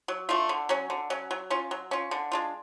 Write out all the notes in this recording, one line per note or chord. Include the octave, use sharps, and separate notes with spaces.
F#3
A3 D4 F4
D3
F#3 C#4
D3
F#3 C#4
F#3
C#4 F4
F#3
C#4 F4
D3
G#3 D4 F4